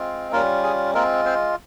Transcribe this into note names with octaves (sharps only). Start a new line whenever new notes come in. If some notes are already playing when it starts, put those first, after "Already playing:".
Already playing: G#3 C4 F4
G3 A#3 C#4 F4 A#4
G#4
G#3 A#3 C4 F4 A#4
C4 C5